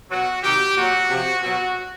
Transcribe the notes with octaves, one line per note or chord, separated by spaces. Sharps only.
B2 F#3 F#4
C3 D#3 F#3 G4
A#2 F#3 F#4
C3 F3
B2 F#3 F#4